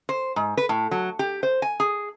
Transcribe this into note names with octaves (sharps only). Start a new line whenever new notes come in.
C5
G#2
B4
A2
F#3
G4
C5
G#5
G#4